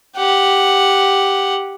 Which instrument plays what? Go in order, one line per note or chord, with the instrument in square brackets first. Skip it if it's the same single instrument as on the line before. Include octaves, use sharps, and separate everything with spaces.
[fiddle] G4 F#5